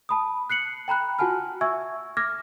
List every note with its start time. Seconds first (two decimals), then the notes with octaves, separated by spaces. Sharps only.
0.09 A5 B5 D#6
0.50 F#6 C7 C#7 F#7
0.88 G5 A#5 B5 F#6
1.19 F4 F#4 F#5 G#5 A5 F6
1.61 E5 G#5 C#6 E6 G#6
2.17 D6 F6 G#6 A#6